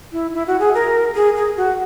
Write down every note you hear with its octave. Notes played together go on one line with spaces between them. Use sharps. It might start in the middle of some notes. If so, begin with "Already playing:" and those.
E4
E4
F#4
G#4
A#4
G#4
G#4
F#4